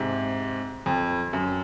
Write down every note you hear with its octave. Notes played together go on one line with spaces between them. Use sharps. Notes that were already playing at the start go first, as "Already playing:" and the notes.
Already playing: G#2 C3
F2
F#2